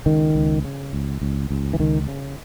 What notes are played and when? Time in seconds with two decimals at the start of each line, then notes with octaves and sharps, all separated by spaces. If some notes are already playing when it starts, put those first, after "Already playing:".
0.06 C#2 D#3
0.35 C#2
0.64 C#3
0.93 C#2
1.22 C#2
1.50 C#2
1.73 E3
1.79 C#2 D#3
2.08 C#3